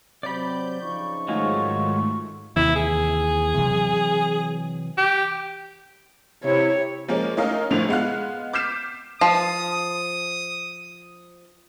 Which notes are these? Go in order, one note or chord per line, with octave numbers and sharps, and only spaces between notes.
C3 F#3 C4 D5 B5 G6
C#3 F3 D#4 C#6
G#2 D#3 F#3 G#3 A3 F4
D#2 C3 E3 E4
G#4
C3 E3 F#3
G4
C3 E4 C#5
F3 G#3 A#3 C#4
A3 C#4 D#4 A#4 D#5 F5
G1 A2 D3 F3 F7
G#3 B3 F5 F#6
D6 F6 G6 B6 C7 E7
F3 D#6